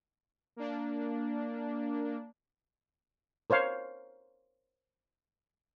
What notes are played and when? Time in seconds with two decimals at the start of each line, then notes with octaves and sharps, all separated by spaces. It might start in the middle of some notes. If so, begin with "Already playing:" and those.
0.56 A#3 D4
3.50 A#4 C5 C#5 F5